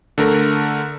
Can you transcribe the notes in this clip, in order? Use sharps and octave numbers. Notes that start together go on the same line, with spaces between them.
D3 A3 A#4